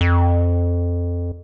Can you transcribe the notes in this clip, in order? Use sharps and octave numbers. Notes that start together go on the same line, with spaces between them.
F2